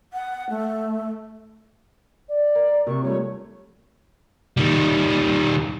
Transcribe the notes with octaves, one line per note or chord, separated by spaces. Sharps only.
F#5
A3
D5
A#4
C3 A#4 C#6
F3 G3 A3 C#5
D#3 G3